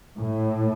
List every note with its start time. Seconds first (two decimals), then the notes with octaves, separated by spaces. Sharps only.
0.18 A2